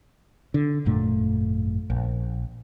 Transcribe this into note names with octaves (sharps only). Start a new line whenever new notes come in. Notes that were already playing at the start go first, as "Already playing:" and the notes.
D3
G#1 F#2 A#2 A3
A#1